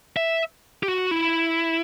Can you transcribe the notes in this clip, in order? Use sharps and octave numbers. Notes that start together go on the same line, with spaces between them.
E5
G4
F#4
E4